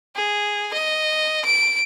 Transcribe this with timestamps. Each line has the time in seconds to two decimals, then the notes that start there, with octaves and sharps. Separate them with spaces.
0.16 G#4
0.73 D#5
1.45 D7